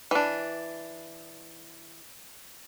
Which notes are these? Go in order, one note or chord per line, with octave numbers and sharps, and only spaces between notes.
E3 D4